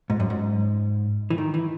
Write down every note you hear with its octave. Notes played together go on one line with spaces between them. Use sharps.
G#2
F#2
G#2
E3
D#3
E3